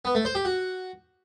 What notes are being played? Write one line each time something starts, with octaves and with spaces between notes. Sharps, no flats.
B3
A3
C5
G4
F#4